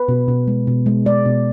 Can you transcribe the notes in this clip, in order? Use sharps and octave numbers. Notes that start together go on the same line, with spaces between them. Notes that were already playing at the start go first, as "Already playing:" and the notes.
Already playing: B4
B2
B2
G#3
B2
G#3
G#3 D5
B2